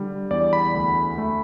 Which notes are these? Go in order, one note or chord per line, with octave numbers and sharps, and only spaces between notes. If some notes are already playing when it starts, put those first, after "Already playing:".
Already playing: D3 G3
E2 D5
B5
D2
A3